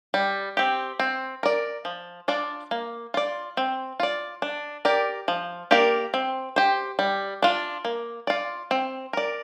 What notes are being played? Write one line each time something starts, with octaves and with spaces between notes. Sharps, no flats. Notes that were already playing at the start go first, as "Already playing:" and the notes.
G3
C4 G4
C4
A#4 D5
F3
D4 F4 D5
A#3
F4 D5
C4
F4 D5
D4
G4 A#4 D5
F3
A#3 G4 A#4 D5
C4
G4 C5
G3
D4 F4
A#3
F4 D5
C4
A#4 D5